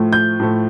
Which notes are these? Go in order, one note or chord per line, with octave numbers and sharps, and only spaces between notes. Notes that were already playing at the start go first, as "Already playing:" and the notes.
Already playing: A2 F3 A3
G6
A2 F3 A3